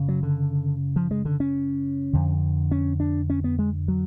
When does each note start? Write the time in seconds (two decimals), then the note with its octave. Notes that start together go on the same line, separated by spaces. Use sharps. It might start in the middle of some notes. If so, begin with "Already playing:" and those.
Already playing: F#2 C#3
0.08 F#3
0.23 D3
0.96 F3
1.11 G#3
1.25 D3
1.40 C#4
2.13 F2 D3
2.71 C#4
3.00 D4
3.30 C#4
3.44 B3
3.59 G#3
3.88 F#3